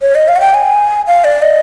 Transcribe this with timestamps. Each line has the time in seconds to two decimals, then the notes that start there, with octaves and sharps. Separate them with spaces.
0.02 C#5
0.15 D#5
0.28 F5
0.36 F#5
0.41 G5
0.54 G#5
1.07 F5
1.24 D5
1.42 D#5